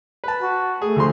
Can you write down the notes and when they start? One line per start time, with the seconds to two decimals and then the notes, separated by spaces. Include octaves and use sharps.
0.24 B4 A5
0.41 F#4
0.82 A3 G#4
0.96 D2 F3 C6